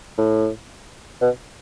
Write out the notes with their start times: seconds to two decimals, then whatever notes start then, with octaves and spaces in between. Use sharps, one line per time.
0.18 A2
1.21 B2